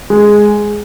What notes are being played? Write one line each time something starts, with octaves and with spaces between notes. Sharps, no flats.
G#3